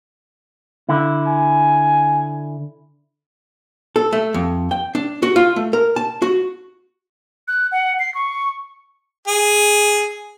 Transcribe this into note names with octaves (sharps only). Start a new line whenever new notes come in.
D3 E4
G#5
A4
A3
F2
G5
D4
F#4
F4
A3
A#4
A5
F#4
F#6
F#5
C7
C#6
G#4